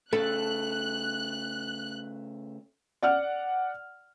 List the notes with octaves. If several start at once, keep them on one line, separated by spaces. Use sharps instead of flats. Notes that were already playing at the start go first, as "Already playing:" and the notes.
C#3 A3 A4 F#6
D5 F#5 F6